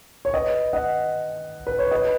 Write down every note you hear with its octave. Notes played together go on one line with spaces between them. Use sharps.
C#5
B4 D#5
D#5 F#5
B4
C#5
B4 D#5